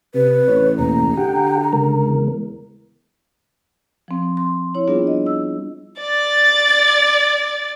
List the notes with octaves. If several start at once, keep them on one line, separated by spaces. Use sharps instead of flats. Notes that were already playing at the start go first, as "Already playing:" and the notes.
C3 B4
A1 C#5
E2 B2 A#3 A#5
D3 G4 F#5 G5
C#3 G#3 A#4
E2
F3 C4
C6
E4 C#5
G3 B3 D4 F4 G#4
D#5
E6
D5 A6